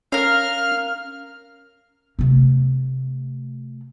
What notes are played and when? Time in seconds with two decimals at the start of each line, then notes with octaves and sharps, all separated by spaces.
0.12 C#4 A#4 F5 F6
2.19 C3 A3